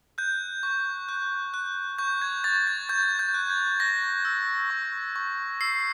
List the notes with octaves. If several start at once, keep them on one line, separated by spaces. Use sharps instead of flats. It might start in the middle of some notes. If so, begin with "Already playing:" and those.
F#6 G6
C#6
F#6
F#6
C#6 G6
G#6
C#6 A6
G#6
C#6 G6
G6
F#6
G#6
C#6 A#6
E6
C#6
C#6
E6 C7